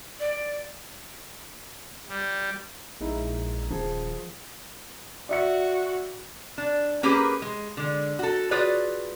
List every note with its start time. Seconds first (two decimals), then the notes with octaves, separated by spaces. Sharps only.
0.20 D5
2.08 G3
3.01 A#1 G#3 D#4 E4
3.70 D#1 F3 G#4
5.29 F#4 D5 E5 C#7
6.58 D4
7.03 A#3 C#4 G4 G#4 A#4 B4
7.42 G#3
7.77 D3 G#3
8.19 F#4 A4
8.51 F4 F#4 G#4 B4 C#5 D5